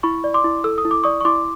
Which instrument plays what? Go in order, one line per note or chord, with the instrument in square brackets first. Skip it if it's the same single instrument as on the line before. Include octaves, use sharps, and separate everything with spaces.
[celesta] E4 B5 C#6
D5
C6 D6
E4
A4 E6
D#6
E4
D6
D5 C#6 D#6
C#6
E4 C6 D6